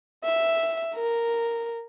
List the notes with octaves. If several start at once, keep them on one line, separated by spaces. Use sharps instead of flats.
E5
A#4